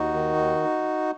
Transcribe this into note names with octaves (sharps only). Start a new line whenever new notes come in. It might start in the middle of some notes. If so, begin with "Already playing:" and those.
Already playing: D#2 D#4 F#4
D#3
D#2